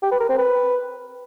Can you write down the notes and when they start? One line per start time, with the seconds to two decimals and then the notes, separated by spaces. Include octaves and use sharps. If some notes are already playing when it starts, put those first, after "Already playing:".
0.03 G4
0.12 B4
0.20 A#4
0.29 C4
0.38 B4